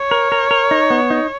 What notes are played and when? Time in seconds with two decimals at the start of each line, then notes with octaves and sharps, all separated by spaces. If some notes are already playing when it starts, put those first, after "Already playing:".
Already playing: C#5
0.11 A#4
0.32 A#4
0.51 A#4
0.71 D#4
0.90 B3
1.10 D#4